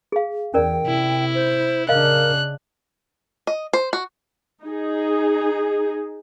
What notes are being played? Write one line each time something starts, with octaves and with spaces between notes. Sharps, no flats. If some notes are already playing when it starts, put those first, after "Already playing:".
G#4 F5
E2 C#4 A#4 D5 G5
C3 E4
C5
C#3 D4 A#4 D#5 F5 F#6
D#5
C5
F#4
D#4 G#4